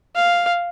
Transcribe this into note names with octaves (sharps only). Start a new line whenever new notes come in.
F5